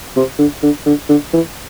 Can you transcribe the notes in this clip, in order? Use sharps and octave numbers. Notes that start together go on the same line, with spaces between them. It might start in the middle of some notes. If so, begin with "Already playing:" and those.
C3
D3
D3
D3
D3
E3